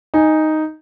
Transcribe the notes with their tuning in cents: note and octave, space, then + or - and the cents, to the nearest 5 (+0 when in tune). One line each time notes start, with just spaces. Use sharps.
D#4 +0 G#5 -10